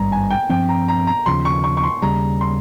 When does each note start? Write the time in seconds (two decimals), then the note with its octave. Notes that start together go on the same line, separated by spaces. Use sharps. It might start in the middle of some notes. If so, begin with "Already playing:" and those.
Already playing: G#1 G2 G3 A#5
0.12 G#5
0.30 G5
0.49 G2 F3 C4 G5
0.69 A#5
0.88 A#5
1.07 A#5
1.26 D#2 C#3 F3 C6
1.45 C#6
1.64 C#6
1.77 C#6
1.83 C6
2.02 D#2 C#3 G3 A#5
2.41 C6